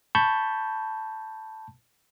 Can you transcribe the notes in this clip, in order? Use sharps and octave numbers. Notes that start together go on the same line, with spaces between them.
A5 B5 C#6 G6